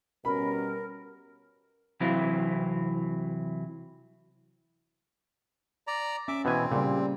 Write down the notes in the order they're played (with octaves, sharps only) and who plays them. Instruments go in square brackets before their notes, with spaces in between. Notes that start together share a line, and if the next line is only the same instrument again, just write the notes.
[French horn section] B2 G3 C#4 [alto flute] A#4 [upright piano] B5
[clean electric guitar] C3 E3 F#3 C4 E4 F5
[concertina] D5 A#5
[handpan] C#4 [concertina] E5 D6
[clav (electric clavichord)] B2 E3 G#5 [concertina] C4
[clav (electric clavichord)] A#2 [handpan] C#3 G3